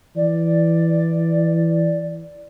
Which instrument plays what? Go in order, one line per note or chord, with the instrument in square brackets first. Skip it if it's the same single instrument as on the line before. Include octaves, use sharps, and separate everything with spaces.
[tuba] E3 [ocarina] D5